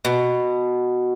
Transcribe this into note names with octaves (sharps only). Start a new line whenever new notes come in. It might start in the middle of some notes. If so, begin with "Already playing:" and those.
B2